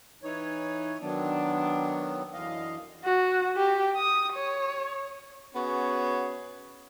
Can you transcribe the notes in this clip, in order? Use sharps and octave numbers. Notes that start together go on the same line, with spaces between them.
E3 D#4 C#5
D#3 F#3 B3 D4
F#2 D3 E3 D#5 F5
F#4
G4
D#6
C#5
B3 C#4 F#4 G#4 C#5